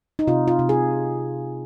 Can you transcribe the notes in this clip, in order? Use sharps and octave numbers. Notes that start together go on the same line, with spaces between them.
D#4
C3 F4
F4
C3
G#4